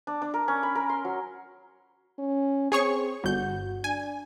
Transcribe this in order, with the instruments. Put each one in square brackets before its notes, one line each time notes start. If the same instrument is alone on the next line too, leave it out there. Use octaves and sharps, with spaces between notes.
[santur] D4
D4
A#4
C#4
B5
A#4
C6
F#3
[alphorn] C#4
[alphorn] C4 [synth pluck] G#4 C#5 C#6
[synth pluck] G1 G6 [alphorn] F#4
[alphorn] D4 [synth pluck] G#5